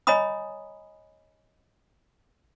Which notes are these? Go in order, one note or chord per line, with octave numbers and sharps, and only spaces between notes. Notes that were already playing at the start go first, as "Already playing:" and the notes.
C#5 D#5 G#5 A#5 B5 D#6